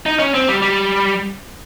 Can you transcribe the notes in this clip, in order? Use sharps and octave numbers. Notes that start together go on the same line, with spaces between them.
D#4
C#4
C4
G3
G3